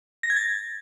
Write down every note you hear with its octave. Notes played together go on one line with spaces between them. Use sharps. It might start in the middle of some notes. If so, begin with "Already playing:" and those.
A#6
G#6
A6